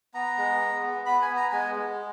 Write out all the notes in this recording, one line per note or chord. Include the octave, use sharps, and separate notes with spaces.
B3 A#5
G#3
B3
B3
B3 B5
G#5
B3
A#5
G#3 G#5
G#3